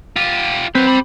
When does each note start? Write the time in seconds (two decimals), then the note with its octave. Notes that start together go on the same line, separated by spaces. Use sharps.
0.16 F4 G4
0.75 F#3 C4 B4
0.87 G4 B5